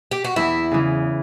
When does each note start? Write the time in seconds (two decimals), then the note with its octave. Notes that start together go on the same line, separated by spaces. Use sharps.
0.11 G4
0.24 F#4
0.36 E2 E4
0.71 C#3 E3